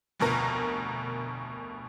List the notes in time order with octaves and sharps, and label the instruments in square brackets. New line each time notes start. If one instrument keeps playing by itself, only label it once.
[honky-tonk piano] F1 D2 B2 A#4 A#5